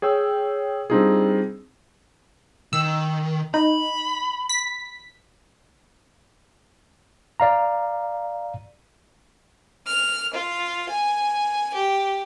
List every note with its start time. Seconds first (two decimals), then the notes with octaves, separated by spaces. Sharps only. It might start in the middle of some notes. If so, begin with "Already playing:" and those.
0.02 G#4 C#5 G5 E6
0.90 G3 C4 D4 D#4 F4 G#4
2.73 D#3 E6
3.54 D#4 B5
4.49 B6
7.40 D5 F5 A#5
9.87 F6
10.33 F4
10.89 G#5
11.74 G4